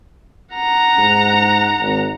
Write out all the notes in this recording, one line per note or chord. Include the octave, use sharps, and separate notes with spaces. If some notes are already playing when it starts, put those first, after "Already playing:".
F#5 A#5
G#2
G#1